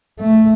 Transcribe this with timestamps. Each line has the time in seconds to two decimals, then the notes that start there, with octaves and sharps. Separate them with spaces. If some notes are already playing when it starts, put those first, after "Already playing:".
0.20 A3